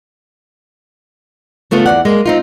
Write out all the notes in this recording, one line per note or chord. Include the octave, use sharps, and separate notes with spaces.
C#3 A3 B3 F4
E2 D5 F#5
G#3 A#3
C4 D#4 F4